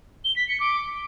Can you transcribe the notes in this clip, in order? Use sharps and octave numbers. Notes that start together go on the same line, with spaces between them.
G7
B6
C#7
D6